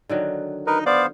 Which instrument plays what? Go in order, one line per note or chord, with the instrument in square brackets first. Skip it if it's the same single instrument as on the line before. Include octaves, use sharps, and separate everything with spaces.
[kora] D3 D#3 F#3
[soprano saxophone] D#4 [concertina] A#4 B4 D#5
[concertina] B3 C5 F5 [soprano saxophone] D5